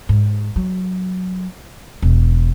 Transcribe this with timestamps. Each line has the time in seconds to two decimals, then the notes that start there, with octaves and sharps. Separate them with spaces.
0.09 G#2
0.56 F#3
2.02 E1